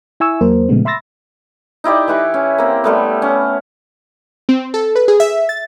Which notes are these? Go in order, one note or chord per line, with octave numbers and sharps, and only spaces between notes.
E4 E5 G#5 C#6 E6
E2 F#3 A#3 A#4 C5
A#2 C#3 F3 G#3 A3 B3
E5 B5 C6 E6 A6 A#6
D#4 E4 G4 D5
E3 G4 B4 C#6
C#4
A#3 C4
G3 A3 B3
C#4
C4
A4
B4
G#4
E5
A6